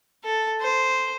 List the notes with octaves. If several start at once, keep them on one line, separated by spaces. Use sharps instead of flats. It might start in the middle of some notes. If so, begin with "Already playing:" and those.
A4
C5